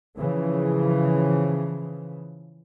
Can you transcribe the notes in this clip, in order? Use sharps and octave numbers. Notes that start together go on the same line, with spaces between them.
C#3 E3 F3